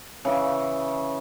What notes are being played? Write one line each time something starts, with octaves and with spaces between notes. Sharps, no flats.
C#3 E3